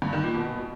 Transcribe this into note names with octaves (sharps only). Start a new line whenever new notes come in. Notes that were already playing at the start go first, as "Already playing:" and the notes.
G2
D#3
A#2
B2